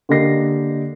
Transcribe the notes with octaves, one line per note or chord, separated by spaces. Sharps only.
D3 A#3 G4 D#5 A#6 C7